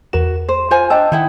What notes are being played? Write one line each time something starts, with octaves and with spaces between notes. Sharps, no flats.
E2 F#4 A#4 E7
C5
F4 C5 G#5
D4 D#5 G5 A5 E6
D#3 D#4 E4 F#5 G5